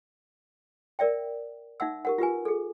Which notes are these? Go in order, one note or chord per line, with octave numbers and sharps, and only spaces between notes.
A#4 D5 E5 G5
D#4 E5 F#5 E6
G4 A#4 F#5
F4 G4 B4 G#5
G#4 A4